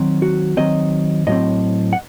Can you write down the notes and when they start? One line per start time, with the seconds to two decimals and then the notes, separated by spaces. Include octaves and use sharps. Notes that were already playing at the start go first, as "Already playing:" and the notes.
Already playing: D#3 F#3 C4
0.22 F#4
0.57 D#3 F#3 C4 D#5
1.27 A2 F#3 C4 D#5
1.93 F#5